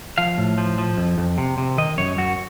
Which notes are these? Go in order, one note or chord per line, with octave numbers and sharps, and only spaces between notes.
F3 F5
A2
F3
F3
F2
F2
C3
C3
D#3 D#5
F#2 C#5
F#2 F#4